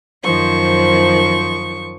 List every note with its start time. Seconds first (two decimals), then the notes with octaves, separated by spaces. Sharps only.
0.22 F#2 D#3 F3 C5 C#6